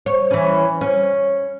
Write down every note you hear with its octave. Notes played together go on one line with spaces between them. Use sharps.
C#5
E3 C#4
C#4